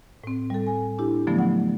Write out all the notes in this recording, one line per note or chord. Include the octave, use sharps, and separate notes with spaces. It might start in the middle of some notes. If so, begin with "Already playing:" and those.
A2 C4
G3 A4
G#5
D4 E4 G4
D3 F3 F#3 A3 B3
F#5